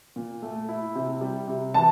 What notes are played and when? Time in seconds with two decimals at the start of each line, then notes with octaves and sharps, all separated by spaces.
0.16 A#2
0.42 A3
0.69 E4
0.95 C3
1.21 G3
1.47 C3
1.74 E3 A5